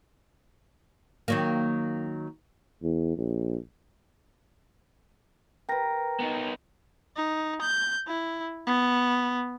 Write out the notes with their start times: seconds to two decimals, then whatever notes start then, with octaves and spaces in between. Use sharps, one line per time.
1.28 D#3 F#3 A#3
2.83 E2
3.17 A#1
5.69 A#4 B4 G5 A#6
6.20 B3 D#4
7.16 D#4
7.61 G6
8.07 E4
8.67 B3